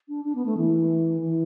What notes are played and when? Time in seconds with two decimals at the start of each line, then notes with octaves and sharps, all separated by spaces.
0.08 D4
0.24 D4
0.35 B3
0.46 A3
0.57 E3
1.21 E3